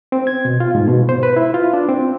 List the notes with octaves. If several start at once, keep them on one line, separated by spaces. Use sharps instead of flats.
C4
G#6
B2
F4
G#2
B2
C5
B4
E4
F4
D4
C4